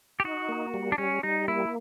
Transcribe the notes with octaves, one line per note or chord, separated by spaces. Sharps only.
G4
D#4 F#4
A#3
G3
D4
G3 C#4
G3 D#4
A#3 E4